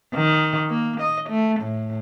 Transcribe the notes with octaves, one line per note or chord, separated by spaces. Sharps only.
D#3
A#3
D#5
A3
A2